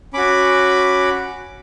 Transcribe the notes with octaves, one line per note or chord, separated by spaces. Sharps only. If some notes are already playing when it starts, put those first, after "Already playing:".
C#4 F#4 B5 D6